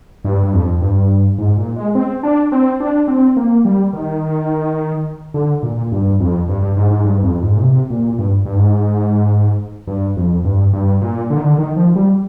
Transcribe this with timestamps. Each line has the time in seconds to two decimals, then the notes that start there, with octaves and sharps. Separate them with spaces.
0.25 G2
0.43 G2
0.53 F2
0.81 G2
1.39 G#2
1.57 A#2
1.76 G#3
1.95 C4
2.23 D4
2.52 C4
2.80 D4
3.08 C4
3.37 A#3
3.65 G3
3.93 D#3
5.34 D3
5.63 A#2
5.92 G2
6.20 F2
6.48 G2
6.62 G2
6.77 G#2
6.91 G#2
7.05 G2
7.23 F2
7.42 G#2
7.56 A#2
7.62 C3
7.90 A#2
8.19 G2
8.46 G2
8.56 G#2
9.87 G2
10.16 F2
10.45 G2
10.73 G2
11.02 A#2
11.30 D3
11.37 D#3
11.44 D3
11.58 D#3
11.76 F3
11.96 G3